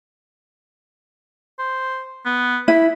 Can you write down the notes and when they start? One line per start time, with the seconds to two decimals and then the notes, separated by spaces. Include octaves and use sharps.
1.59 C5
2.25 B3
2.68 E4 B5